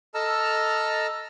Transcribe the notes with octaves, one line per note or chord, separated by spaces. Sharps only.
A4 D#5 A5 A#5 E6 F6